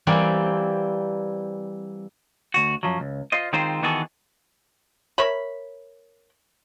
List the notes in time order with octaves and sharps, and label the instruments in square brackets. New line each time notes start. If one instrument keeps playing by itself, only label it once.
[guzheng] E3 G3 A#3 C4
[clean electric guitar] D2 F#4
F#2 F3 F#3
C#2
F4 C5 D#5
D#3 G#3 C4 F4 C5
D#3 E3 B3 F#4 G#4 A4
[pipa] A#4 C#5 E5 B5